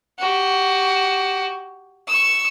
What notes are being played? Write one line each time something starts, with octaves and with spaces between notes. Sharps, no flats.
F#4 G4
C#6 E6